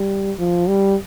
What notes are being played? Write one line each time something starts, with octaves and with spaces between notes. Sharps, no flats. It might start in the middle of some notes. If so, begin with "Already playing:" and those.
Already playing: G3
F3
G3